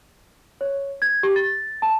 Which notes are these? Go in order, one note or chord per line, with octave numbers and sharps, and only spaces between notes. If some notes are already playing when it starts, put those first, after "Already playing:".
C#5
G#6
G4
A6
A5